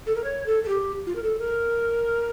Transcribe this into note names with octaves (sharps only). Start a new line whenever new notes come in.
A4
A#4
C#5
A4
A4
G4
F4
A#4
A4
A#4